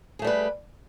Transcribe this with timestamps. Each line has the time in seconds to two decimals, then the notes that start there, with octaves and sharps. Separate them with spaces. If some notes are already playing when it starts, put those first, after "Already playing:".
0.19 G#4
0.22 A3
0.24 G3
0.27 B4